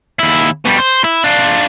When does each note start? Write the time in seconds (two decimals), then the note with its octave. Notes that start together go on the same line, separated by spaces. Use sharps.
0.19 D#2 E4
0.65 B2 G3
0.78 C5
1.04 E4
1.24 D4 F4